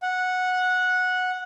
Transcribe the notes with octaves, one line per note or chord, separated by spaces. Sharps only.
F#5